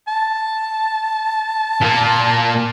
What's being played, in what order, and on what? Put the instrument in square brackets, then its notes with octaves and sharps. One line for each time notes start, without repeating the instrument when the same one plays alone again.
[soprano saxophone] A5
[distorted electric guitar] A#2 A#3